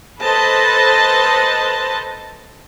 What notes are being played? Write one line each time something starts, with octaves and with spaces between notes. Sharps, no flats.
A4 B4 C5 D#5 A5